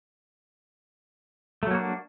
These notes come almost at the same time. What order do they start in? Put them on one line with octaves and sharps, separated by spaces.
A3 F#3 A#3 F#4 D4